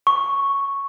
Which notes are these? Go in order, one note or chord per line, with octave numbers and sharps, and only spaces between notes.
C#6